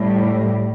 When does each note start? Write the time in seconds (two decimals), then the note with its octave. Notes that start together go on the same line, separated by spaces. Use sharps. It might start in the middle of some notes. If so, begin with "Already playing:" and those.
Already playing: A2 G3